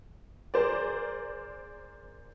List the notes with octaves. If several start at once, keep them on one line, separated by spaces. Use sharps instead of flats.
G#4 A#4 C5 D5